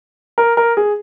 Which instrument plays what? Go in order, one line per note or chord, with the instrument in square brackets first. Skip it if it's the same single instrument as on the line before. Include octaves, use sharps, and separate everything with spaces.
[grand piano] A#4
A#4
G#4